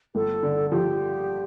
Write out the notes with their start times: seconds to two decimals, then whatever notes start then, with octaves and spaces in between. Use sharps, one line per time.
0.15 G1 A4
0.43 D3
0.72 F3 G4